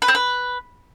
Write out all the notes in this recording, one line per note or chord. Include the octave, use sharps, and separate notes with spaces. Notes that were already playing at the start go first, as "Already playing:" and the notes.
B4
C4
B4